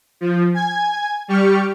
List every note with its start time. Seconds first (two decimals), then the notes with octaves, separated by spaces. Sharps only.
0.21 F3
0.54 G#5 G#6
1.28 G3 G4 C#6 F6